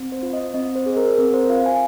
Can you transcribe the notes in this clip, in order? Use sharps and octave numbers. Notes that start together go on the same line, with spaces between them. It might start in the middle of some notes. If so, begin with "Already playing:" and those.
Already playing: C4
C5
F4
D#5
C4 D#5
C5
G#4
A#4
C4 A#4
C5
F4 F5
G#5